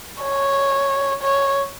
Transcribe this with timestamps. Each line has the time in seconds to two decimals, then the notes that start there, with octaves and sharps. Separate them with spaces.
0.23 C#5
1.22 C#5